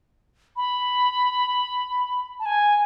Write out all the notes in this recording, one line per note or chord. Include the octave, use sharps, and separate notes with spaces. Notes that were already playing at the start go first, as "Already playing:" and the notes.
B5
A5
G#5